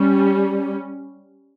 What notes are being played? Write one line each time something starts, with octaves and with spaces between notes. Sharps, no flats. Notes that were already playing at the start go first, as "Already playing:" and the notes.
Already playing: G3 C#4